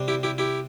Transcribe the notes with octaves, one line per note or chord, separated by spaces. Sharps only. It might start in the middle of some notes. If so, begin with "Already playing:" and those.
Already playing: C3 G3 D4
E4 G4
E4 G4
E4 G4